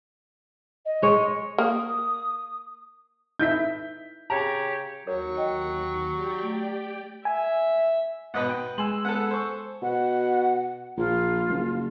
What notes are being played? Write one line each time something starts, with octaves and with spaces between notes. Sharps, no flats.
D#5
G#3 C#5
A#3 D#6
D#4 E4 E5 G6 B6
C#3 G4 C#5 A#5
D#2 F#3 A#4 C#5 C#7
D#5 G5
G4 D5 G5
A3
E5 G#5
G#1 B2 B4 D#5 F#5
G5
G#3 G#5 C6 E6 F#7
B3 A4 F#5
C5 C#6
B2 F#5
A#1 F4
F#1